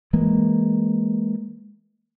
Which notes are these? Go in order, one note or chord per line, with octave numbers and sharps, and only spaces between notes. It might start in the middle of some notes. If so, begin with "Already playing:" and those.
E3 G#3 A#3